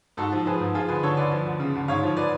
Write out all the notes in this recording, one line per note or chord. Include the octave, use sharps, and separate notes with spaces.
G#2 F#4 A4
F3
F3 G#4 B4
G#2
F3 F4 G#4
D2 G#4 B4
D3 A4 C#5
D2 B4 D5
F3
D2
C#3
D2
G#2 C#5 F5
F3
F3 B4 D5